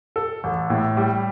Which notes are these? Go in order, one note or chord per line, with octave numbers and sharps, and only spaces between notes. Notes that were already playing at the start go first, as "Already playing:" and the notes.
A4
A1
A2
G3